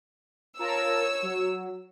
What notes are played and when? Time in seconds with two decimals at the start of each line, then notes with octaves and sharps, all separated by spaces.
0.59 F4 A#4 C#5 A5 E6
1.22 F#3